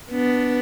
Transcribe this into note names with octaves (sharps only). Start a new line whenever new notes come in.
B3 D4